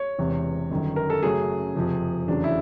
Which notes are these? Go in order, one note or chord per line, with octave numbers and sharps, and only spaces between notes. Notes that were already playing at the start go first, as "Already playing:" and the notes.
Already playing: C#5
E1 E2 C3
G1 F#2 D#3
A#4
A4
F#2 C#3 F#3 A3 G#4
F#1 F2 C3 F3
F1 E2 C#3 F#3 D4
E4